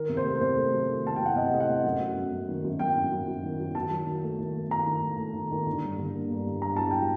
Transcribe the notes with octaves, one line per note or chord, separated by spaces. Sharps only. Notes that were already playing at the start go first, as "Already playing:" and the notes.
Already playing: D#3 A#4
C3
C5
A3
A#4
C3 C5
A3
F#3
D#3
A3 A5
F#3 G5
F#5
C3 D#5
A3 D#5
F#5
A3
F#2
F#3
F#2
F#2
D#3
F#2
F#2 G5
F#2
F#2
F#3
D#3
F#3
D#3 A5
F#3
D#3
A3
D#3
A3
D#3 A#5
D#3
A3
A3
D#3
D#3
D3
G2
D3
A#3
G2
D3
G2 A#5
F#3 A5
F#3 G5